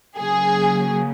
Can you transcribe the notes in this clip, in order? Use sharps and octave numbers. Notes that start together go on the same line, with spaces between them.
C#3 F#3 A#3 G#4